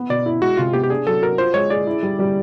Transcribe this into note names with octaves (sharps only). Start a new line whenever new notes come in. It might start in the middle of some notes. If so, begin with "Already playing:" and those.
Already playing: B3
B2 D5
E4
G#3 F#4
C3 F4
B3 G4
G4
D4 G#4
F#3 A4
F#4 A#4
F4 C5
G#3 C#5
G#4 D5
E4
G3
G3